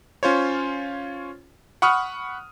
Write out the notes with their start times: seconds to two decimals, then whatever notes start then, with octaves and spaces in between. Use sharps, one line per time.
0.23 C#4 F4 C5 C#5
1.82 F#5 B5 C#6 D#6 F6